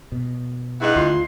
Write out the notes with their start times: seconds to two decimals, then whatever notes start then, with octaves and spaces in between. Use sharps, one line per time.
0.12 B2
0.81 G2 D#4 E4 G#4 F#5
0.96 D2 F4 C6